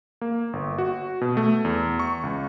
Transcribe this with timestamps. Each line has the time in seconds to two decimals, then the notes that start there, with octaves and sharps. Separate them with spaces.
0.21 A#3
0.53 G1
0.78 F#4
1.21 B2
1.37 A3
1.65 E2
1.99 C#6
2.23 C#2